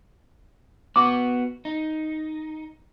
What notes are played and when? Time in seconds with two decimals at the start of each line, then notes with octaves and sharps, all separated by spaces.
0.96 B3 F#4 D6
1.65 D#4